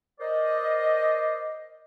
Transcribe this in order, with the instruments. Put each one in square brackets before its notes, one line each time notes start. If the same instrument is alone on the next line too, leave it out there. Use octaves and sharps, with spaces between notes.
[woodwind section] A#4 C5 D5 D#5